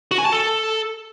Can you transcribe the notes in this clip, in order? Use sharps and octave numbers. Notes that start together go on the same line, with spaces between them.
F#4
G#5
A5
A4